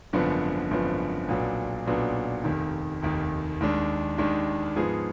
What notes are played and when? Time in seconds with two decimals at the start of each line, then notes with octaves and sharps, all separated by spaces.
0.13 G#1 F#2 D3 F3 B3
0.71 G#1 F#2 D3 F3 B3
1.28 B1 A#2 F#3 B3 D4
1.86 B1 A#2 F#3 B3 D4
2.44 F1 D#2 D#3
3.03 F1 D#2 D#3
3.60 D#2 D#3 G#3 D4
4.18 D#2 D#3 G#3 D4
4.76 G#2 F3 B3 F4 G#4